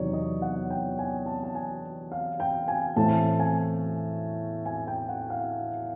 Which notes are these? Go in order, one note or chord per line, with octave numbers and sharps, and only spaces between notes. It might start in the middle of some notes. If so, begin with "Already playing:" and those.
Already playing: E2 C3 D#3 F#3 C#5 D5
D#5
F#5
G5
G#5
A5
A5
G#5
F5
G5
G#5
A2 E3 A3 C4 A5
G#5
G#5
G5
F#5
F5